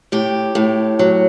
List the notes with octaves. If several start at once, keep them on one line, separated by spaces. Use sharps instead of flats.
A2 G4
A2
F#3